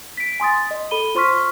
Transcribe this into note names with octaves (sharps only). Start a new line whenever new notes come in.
B6 D7
G#5 C6 D#6 A6
D#5
A4 B5 D#7 G7
F4 C5 C6 C#6 F6 B6